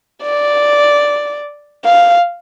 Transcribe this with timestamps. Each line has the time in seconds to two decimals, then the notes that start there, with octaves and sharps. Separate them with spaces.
0.22 D5
1.85 F5